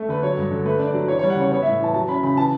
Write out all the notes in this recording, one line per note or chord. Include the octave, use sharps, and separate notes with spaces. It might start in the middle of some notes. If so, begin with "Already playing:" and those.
Already playing: A3
D3 B4
F#3 C#5
G2
D3
A3 B4
D4
D5
F#3
E3 C#5
G3 C#5
F#5
C#3 C#5
B3 C#5
A2 E5
E3 A5
F#3 A5
C#4 B5
C#3 B5
E3 A5